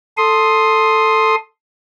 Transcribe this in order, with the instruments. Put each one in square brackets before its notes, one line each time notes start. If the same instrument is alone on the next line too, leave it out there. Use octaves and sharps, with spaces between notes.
[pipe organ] A4 C6 D#6